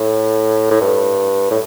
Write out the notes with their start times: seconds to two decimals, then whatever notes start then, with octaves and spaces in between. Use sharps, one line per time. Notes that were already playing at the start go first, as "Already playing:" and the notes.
Already playing: A2
0.71 A2
0.81 G2
1.51 A2